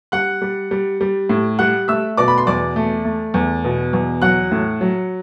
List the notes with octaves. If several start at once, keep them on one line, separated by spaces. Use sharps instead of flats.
G3 F#5 F#6
G3
G3
G3
A2
G3 F#5 F#6
A3 E5 E6
B2 D5 D6
B5
C6
E2 D5 D6
A3
A3
E2
B2
E2
F#3 F#5 F#6
A2
F#3